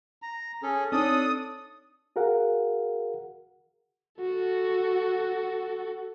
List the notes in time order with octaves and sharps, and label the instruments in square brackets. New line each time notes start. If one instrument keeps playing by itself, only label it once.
[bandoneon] A#5
C#4 G#4 A4
[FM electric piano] C4 D#4 C#5 [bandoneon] D4 A4 D5 [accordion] D#6
[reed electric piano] F#4 G#4 A#4 F5 F#5
[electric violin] F#4 A4